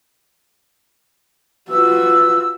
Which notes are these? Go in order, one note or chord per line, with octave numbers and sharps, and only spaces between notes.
F4 F#4 B4 E6